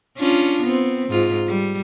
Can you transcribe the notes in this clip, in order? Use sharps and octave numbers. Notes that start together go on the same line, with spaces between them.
C#4 D4 F4
B3 C4
G#2 F4
G3